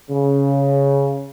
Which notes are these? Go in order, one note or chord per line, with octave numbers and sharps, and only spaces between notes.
C#3